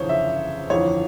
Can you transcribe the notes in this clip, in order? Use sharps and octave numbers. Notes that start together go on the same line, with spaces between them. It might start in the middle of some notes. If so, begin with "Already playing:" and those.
Already playing: G1 F2 C#3 E3 C5 C#5
E5
G1 F2 E3 C#5